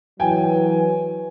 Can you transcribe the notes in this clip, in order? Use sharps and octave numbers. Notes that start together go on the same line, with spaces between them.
E3 F#3 G5 G#5